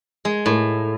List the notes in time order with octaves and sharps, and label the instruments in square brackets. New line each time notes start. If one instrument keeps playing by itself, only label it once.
[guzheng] G#3
A2